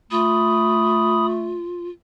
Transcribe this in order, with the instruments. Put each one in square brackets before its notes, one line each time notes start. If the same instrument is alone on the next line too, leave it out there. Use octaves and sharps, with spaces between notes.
[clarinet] A3 [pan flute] F4 [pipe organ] B5 D#6